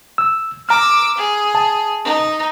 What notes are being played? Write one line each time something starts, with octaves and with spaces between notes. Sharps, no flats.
E6
A#5 D6 E6 F6
G#4
A5
D#4